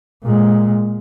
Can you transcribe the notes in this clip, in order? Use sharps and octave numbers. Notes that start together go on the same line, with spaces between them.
A#2 G#3